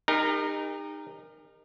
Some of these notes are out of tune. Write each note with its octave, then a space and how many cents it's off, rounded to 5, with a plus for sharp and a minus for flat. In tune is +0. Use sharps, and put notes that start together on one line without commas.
D#4 -15 G4 +45 A#4 +0